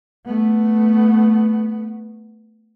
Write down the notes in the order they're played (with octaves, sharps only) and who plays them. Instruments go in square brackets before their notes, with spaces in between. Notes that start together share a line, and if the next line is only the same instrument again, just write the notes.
[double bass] A3 B3